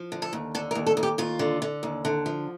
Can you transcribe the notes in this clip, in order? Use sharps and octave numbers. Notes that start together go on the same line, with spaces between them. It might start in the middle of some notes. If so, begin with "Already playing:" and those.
Already playing: F3
D3
A4
D#2
D3 A4
A#4
D#2
A4
D#2
G4
D#2 F4
D3
D3
D#2
D3
F3